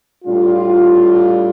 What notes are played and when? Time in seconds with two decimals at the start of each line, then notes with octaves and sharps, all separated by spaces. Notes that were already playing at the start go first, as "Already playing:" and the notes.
0.25 A2 G3 D4 F4